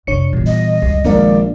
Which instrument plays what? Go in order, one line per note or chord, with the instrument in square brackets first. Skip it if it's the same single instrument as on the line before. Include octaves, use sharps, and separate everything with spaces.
[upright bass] F2 C3 [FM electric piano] D4 C#5 C#7
[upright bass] A#2 B3 [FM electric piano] E3 G3
[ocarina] D#5
[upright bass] C#2 F#2 [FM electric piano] G3
[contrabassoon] A#1 [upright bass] D#3 [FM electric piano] G#3 A#4 F5 [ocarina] D5